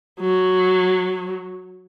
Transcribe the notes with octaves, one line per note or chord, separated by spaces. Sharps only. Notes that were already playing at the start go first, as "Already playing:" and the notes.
F#3